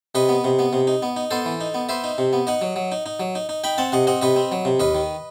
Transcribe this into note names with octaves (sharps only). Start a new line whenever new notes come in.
C3 B4 D#5
B3
C3
B3
C3
D#4
B3
D#4
B3 A4 C5
E3
D#4
B3
B3 C5 E5
D#4
C3
B3
D#4 D#5 F#5
F#3
F#3
D#4
D#4
F#3
D#4
D#4
D#4 G5 B5
C4 F#5 A5
C3 D#5 F#5
C4 D#5 F#5
C3 B4 D#5
C4
F#3
C3
D#2 B4 D#5
D#3